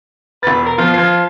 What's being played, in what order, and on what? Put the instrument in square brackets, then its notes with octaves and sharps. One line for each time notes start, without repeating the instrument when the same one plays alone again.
[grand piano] E1 A6 [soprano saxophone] B4
[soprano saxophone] A#4
[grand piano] B2 F3 [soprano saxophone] F4
[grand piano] F3 G#6 C7